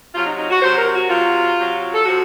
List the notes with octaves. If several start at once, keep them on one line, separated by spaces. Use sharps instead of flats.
C3 F#3 F4
D#4
D#4
F#4
C3 F#3 C5
A#4
F#4
C3 F#3 F4
C3 F#3
A4
C3 F3 F#4